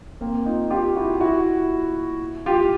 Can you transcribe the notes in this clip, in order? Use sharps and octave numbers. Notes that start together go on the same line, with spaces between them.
A#3 C4
D#4 F4
F4 G4
E4 F#4
E4 F#4
F4 G4